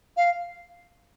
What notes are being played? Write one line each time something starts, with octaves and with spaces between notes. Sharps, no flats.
F5